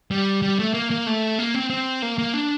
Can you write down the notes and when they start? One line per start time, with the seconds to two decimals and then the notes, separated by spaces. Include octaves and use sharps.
0.11 G3
0.42 G3
0.59 A3
0.74 A#3
0.91 A#3
1.07 A3
1.39 A#3
1.54 C4
1.70 C4
2.02 A#3
2.18 A#3
2.34 D4